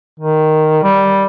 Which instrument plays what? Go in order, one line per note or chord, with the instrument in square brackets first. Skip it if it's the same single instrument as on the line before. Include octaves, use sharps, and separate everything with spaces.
[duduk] D#3
G3